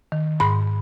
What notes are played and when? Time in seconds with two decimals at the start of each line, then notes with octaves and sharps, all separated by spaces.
0.12 D#3
0.40 G#2 B5